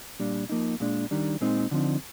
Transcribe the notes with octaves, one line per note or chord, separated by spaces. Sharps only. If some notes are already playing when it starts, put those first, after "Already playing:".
A#2 G3 D4
F3 A#3 D#4
A#2 G#3 D4
D#3 G3 D4
A#2 G#3 C4 D#4
D3 F3 C4 D#4